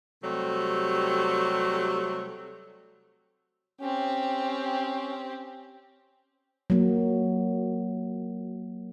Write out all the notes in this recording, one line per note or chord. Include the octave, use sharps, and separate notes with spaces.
C3 F#3 G3 A3
C4 C#4 G4
F#3 A#3